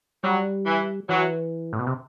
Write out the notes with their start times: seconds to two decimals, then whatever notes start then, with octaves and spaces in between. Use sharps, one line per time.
0.24 F#3 G3
0.66 E3
1.09 E3 F#3
1.73 A2
1.79 B2
1.87 C3